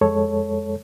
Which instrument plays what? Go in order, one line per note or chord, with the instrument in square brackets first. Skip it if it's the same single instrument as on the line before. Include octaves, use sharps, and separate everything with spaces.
[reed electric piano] F2 G#3 A4 C#5